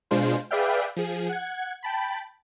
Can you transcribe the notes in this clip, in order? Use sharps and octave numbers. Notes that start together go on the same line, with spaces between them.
B2 G#3 D4 F4 C5
G#4 B4 D5 E5 F5 G5
F3 G#4
F#5 G#6
G5 A5 B5